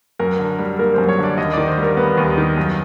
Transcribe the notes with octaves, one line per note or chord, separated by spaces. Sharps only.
F#2 A#4
D3
G3
A#3 A#4
F#2 C5
C#5
D3
D5
D#2 D#5
D#3 D5
C5
G3
A#4
B3
D#2
D#3
F#2